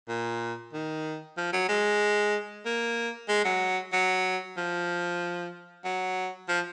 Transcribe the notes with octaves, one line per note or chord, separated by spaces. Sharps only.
A#2
D#3
F3
F#3
G#3
A#3
G#3
F#3
F#3
F3
F#3
F3